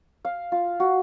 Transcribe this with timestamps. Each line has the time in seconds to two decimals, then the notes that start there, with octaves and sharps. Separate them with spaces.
0.25 F5
0.52 F4
0.80 F#4